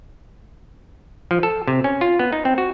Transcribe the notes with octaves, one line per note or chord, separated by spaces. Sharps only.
F3
A4
C3
C#4
F4
B3
D#4
C4
F#4